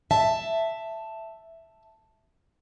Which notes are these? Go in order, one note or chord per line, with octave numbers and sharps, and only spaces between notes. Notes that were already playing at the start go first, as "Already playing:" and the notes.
E5 A5